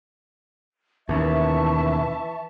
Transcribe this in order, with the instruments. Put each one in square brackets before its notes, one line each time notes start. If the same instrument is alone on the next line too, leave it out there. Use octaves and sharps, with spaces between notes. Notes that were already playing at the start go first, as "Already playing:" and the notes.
[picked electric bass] D#2 [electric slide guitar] B2 C#4 [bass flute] E3 [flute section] E5 A5 C#6